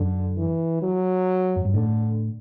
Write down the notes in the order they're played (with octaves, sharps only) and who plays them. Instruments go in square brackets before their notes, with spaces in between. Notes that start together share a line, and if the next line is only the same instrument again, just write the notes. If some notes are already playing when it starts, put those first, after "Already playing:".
Already playing: [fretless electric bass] F#2 [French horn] D3
[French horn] E3
F#3
[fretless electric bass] F#2
G2
[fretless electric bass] A2 [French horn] D3